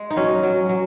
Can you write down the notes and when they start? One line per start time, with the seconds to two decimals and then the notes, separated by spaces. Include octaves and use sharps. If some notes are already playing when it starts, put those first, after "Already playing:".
Already playing: G#3
0.10 D#4
0.16 F#3 C#4
0.43 F#3
0.69 F#3